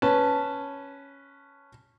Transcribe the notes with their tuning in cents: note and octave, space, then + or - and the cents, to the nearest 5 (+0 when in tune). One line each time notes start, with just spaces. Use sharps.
C#4 +0 B4 +0 A5 +0